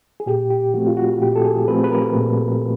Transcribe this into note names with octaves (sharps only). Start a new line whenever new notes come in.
G#4
A#2 G4
G4
F3 A3 C4 F#4
F4
F#4
A#2 G4
A4
G#4
F3 A3 C4 B4
B4
A#4
A#2